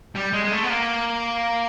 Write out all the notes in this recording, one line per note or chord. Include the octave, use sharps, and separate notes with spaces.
G3
G#3
G#3
A3
B3
A#3